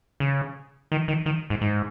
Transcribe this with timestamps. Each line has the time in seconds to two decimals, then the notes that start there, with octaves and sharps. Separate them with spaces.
0.20 C#3
0.92 D#3
1.08 D#3
1.26 D#3
1.50 G#2
1.61 G#2